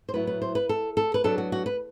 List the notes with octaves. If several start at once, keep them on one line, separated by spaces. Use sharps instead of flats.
C5
A2 F#3 B3 E4 B4
B4
C5
B4
A4
A4
B4
F#3 B3 D4 A4
F#4
F#4
B4